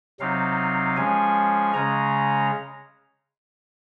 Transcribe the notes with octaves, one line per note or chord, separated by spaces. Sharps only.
C3 F#3 C4 D#4 F5
F3 G#3 C#4 G#5
C#3 G#3 C#4 A#5